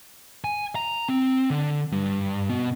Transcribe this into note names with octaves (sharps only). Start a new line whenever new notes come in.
G#5
A#5
C4
D3
G2
B2